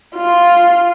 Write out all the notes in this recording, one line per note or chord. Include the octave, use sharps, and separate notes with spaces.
F4